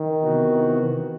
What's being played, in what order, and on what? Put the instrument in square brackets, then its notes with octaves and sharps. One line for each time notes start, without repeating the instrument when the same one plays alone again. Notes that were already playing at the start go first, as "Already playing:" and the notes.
Already playing: [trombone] D#3
[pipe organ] C3 E3 B3 F#4